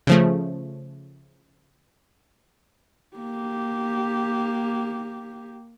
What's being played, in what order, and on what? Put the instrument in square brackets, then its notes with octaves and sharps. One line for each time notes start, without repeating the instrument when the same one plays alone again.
[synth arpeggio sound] C#3 F3 A3
[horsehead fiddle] A#3 G4